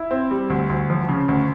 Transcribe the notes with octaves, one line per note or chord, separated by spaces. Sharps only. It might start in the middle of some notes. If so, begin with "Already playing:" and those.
Already playing: E4
C4
G3
D2
D2
F3
C#3
D2